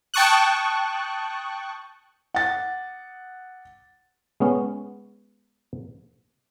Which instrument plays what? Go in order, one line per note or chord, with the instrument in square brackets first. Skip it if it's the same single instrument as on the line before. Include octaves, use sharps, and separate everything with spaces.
[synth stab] G5 A5 C#6 D#6 F#6
[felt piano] F#5 A6
[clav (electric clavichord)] G#3 B3 C#4